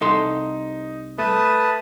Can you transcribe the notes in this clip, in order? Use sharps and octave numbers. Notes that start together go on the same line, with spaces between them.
C2 D#4 A4 C6
A3 B4 A5 D#6